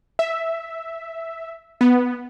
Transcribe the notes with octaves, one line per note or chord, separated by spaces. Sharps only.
E5
B3